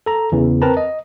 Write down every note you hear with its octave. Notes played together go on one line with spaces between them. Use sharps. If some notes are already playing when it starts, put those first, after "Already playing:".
A4 A#5
E2 C#3 E3
C4 A#4 B4 A5 A#5
D#5